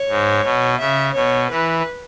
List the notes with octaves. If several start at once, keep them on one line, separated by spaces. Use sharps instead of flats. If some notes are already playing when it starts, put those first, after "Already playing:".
Already playing: C#5
G#2
B2
C#3 E5
B2 C#5
E3 B4